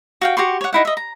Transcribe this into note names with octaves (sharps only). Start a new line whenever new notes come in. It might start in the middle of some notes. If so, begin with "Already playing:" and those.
F#4 F5 G5
F#4 G4 C6 C#6
C#5 F#5
D#4 E4 F#5
D#5 E5
A#5